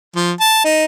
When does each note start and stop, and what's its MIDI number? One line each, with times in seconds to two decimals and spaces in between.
0.15 0.31 53
0.40 0.61 81
0.64 0.85 63